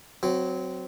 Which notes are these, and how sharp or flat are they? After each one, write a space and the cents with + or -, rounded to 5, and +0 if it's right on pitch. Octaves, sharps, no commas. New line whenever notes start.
F#3 +0 C4 -20